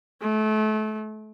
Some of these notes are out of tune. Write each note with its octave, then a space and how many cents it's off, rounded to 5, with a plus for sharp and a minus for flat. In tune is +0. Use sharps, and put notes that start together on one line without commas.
A3 -30